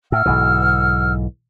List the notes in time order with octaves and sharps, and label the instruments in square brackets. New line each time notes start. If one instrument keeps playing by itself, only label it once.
[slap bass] A2 [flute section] F#5 E6 F6
[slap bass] B1 G#2 E3